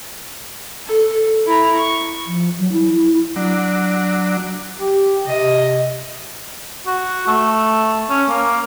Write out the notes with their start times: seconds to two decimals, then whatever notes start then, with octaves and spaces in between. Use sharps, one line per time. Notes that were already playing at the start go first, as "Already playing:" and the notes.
0.86 A4
1.46 E4 A#5
1.76 C#6
2.26 F3
2.59 F#3
2.72 E4
2.94 E4
3.36 F#3 D4
4.79 G4
5.27 C3 D#5
6.87 F#4
7.28 A3
8.10 C#4
8.29 A#3